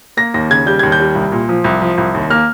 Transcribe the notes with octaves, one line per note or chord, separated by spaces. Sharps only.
A#3 A#6
D#2 A#6
C#3 G#6
G3 G6
D#2 G#6
G6
G3
C2
A#2
F3
C2
F3
C2
D#2
A#3 F6